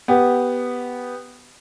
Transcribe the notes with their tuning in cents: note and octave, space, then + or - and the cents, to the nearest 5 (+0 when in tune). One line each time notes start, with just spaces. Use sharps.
B3 +0 G4 +0